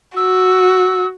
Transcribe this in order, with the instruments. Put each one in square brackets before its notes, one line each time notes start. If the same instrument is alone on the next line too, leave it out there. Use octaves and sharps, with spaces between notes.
[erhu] F#4 [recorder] E6